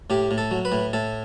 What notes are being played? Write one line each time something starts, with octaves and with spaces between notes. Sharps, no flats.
A2 G4
A2
A4
F#3
B4
A2
A2 A4